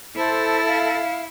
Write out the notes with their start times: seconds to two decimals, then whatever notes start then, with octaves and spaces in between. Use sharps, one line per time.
0.16 E4 A4 C5
0.67 F5